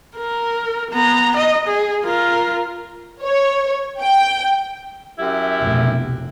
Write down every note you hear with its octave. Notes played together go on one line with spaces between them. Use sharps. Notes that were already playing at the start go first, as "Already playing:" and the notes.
A#4
B3 A#5
D#5
G#4
F4 A#4
C#5
G5
F#2 E4 G4
F1 B2